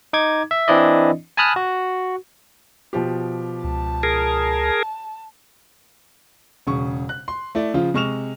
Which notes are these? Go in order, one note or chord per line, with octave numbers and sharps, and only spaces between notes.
D#4 D6 G#6
E5
E3 C4 D4 E4 D5 D#5
G#5 A5 B5 D#6 F6 F#6
F#4
B2 F3 G4
C#2 A5
G#4 A#4
E1 C#3 C#6
F#6
C6
A3 E4 D5
C#3 F3 F4
C3 G#3 C#6 F6 E7 F7